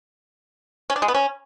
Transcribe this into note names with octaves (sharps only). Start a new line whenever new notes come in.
C#4
D4
G#3
B3
C#4